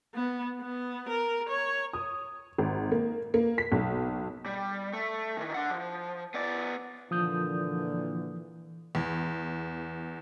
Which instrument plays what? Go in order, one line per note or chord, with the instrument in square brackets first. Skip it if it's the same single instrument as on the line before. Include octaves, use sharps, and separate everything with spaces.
[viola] B3
B3
A#4
C#5
[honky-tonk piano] D#6
G#1
A#3
A#3
B6
B1
[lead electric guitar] G3
A3
D#3 E3
D4 F#5
F3
B3 D5
[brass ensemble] A#2 D3 [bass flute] E3 [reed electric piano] F3 D#6 G6
[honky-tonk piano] E2